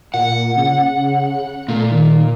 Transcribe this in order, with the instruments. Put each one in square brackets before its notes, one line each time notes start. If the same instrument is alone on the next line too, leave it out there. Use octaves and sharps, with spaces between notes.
[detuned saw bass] A#2 [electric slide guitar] F#5
[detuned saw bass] C#3
[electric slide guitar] A#2 [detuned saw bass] A3
[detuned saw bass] D#3